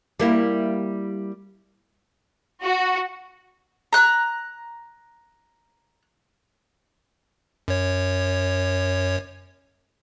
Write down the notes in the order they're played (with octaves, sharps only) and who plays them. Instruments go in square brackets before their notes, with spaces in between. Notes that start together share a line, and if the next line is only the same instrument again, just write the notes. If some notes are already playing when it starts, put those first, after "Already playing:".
[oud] G3 A#3 E4
[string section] F#4
[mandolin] A#5 F#6
[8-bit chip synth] F#2 C#5